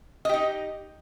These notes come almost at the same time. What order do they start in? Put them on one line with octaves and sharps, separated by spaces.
D#5 G4 D#4